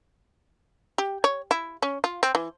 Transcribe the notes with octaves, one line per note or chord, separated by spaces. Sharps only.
G4
C#5
E4
C#4
F4
C4
E3